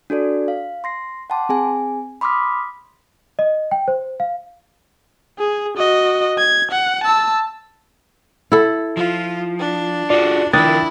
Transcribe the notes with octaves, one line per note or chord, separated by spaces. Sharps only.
D4 F#4 A4 D5
F5
C6 A#6 C7
F#5 G5 A5 C6 D6
C4 G#4 G#5
B5 C6 D6 D#6 F6 B6
D#5
G5
C5
F5
G#4
F#4 D#5
G#6
F#5
A5 E6
E4 A4
F3 F4
D4
F4 F#4 G#4 D5
D#3 F3 D4 E4 A#4 G5 D#6 A6